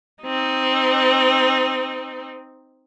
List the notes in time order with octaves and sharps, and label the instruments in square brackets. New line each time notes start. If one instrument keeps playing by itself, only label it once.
[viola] C4 D#4